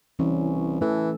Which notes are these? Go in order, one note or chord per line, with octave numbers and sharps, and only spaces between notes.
C2 E3 C#4
E3 A3 A4